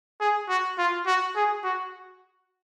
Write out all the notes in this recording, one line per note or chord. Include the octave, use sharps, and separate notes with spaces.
G#4
F#4
F4
F#4
G#4
F#4